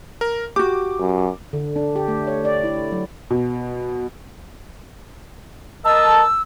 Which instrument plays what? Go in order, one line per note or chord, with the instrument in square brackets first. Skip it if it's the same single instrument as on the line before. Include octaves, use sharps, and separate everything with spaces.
[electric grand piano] A#4
[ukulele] F#4 G4 [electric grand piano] D6
[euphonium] F#2
[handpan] D3
D4
G4
A3
C#5
D5
E4
F#3
[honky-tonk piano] B2
[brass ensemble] A#4 D#5 A5 [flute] E6